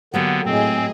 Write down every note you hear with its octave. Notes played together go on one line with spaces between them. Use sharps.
D3 F#3 A#3 B3 G4
A2 C4 G#4 D#5